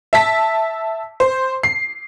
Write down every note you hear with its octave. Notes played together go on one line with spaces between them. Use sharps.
E5 A5 B6
C5
C7